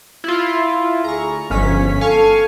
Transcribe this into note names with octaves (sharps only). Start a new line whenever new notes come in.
E4 F4
D2 G#4 A#5 C#6
G1 F3 C#4 B6
A4 F5 G#5 C#6